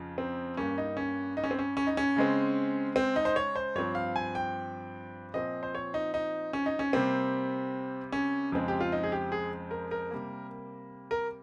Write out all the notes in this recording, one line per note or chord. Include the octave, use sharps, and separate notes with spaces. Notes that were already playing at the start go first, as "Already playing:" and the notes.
Already playing: F2 C#3 F3
C4
G2 G3 A#3 C#4
D#4
C#4
D#4
C#4
C4
C#4
C#4
D#4
C#4
C#3 G#3 C4
C4
D#4
C5
C#5
C5
G2 F3 C4 C#5
F5
G#5
G5
A#2 F3 C4 D#5
C5
C#5
D#4
D#4
C#4
D#4
C#4
C3 G3 A#3 C4
C#4
F2 C#3 G#3 C4
G4
F4
D#4
G#4
G4
G#4
A#4
A#4
C3 G3 A#3
A#4